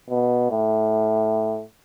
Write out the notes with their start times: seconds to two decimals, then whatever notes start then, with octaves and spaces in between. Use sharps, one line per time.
0.10 B2
0.51 A2